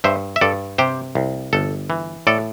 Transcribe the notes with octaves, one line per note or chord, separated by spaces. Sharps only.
G2 C5 E5
E5
G2 A4 D5
C3 G4 C5
C2
G1 A4
E3
A2 A4 D5